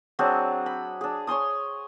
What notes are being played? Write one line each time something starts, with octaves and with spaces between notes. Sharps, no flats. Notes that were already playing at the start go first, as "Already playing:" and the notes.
F#3 C4 D4 G#4
B5
D4 G#4
C#5 G#5 C6 D#6